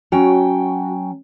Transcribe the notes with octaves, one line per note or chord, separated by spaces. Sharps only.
F#3 C#4 F#4 G5